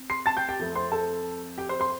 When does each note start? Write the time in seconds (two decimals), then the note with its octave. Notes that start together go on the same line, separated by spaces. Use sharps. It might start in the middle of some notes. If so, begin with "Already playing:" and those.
Already playing: C4
0.10 C6 C7
0.26 A5 A6
0.37 G5 G6
0.49 G4 G5
0.59 F2 F3 A3 C4
0.76 C5 C6
0.92 A4 A5
1.58 G4 G5
1.69 C5 C6
1.80 C5 C6